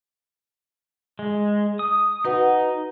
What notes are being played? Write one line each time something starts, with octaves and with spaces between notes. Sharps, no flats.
G#3
D#6
D#4 F#4 B4 F#5